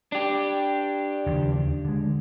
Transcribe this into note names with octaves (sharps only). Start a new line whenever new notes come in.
D4 G4
D#2 C#3 F3
D3 G#3